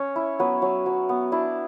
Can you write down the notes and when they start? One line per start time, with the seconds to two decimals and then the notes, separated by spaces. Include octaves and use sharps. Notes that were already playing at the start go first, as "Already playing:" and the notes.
Already playing: C#4 C#5
0.16 E4
0.39 F#3 B3 B4
0.62 F#3
0.86 F#3
1.09 B3
1.32 D4 E4 D5